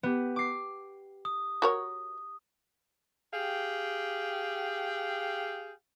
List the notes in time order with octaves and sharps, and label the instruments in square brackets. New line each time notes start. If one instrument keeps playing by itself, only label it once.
[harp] B3 G4
D6 C7
[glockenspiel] D#6
[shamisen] F#4 A#4 C#5
[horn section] G4 G#4 F5 G5